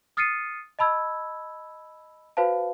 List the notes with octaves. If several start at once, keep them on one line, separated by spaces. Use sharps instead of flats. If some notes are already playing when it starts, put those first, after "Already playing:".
D#6 F6 A6 C7 C#7 D#7
D#5 A5 B5 E6 G#6
F#4 B4 C5 F5 A5